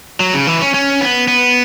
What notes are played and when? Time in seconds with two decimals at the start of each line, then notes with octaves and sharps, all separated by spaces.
0.20 F#3
0.34 C#3
0.47 E3
0.61 C#4
0.74 C#4
1.01 B3
1.28 B3